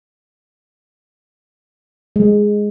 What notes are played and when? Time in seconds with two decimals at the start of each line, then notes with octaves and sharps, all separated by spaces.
2.16 G#3